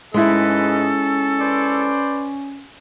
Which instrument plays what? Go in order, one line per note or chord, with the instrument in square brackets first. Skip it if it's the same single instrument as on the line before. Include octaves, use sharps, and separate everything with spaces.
[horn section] G#2 B4 D#5 [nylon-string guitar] G#3 E4 [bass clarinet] C#4 [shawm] A4
[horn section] B4 C5 D5